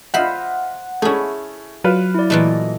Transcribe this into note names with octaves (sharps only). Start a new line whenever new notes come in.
F4 C5 D#5 E5 F#5 B5
A3 C#4 E4 G#4
F#3 F4 B4
E4 D5
A#2 E3 A3 D#5